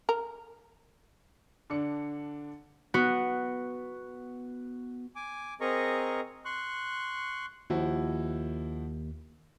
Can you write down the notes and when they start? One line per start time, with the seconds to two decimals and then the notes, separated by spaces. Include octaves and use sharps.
0.09 A#4
1.70 D3 D4 C#7
2.94 B3 F#4
5.16 G#5 D6
5.61 C4 G#4 A#4 D#5 A#5 C#6
6.45 C6 C#6 F#6
7.70 D#2 F3 E4 F#4